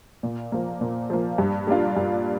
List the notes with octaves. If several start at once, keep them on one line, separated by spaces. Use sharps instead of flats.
A#2
F3 A#3
A#2
F3 A#3
G2
G3 A#3 D4 F4
G2